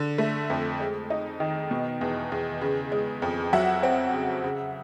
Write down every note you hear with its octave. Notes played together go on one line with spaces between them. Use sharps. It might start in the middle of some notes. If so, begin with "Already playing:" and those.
Already playing: D3
A3
F2
G#3
D#4
D#3
B2
E2
E2
C#3
G#3
F2
F#3 E5 F#5
C4
C#3
C#3